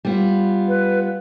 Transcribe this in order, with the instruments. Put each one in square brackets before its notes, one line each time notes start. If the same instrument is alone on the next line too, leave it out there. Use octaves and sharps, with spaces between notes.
[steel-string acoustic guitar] G3 B3 F4
[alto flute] B4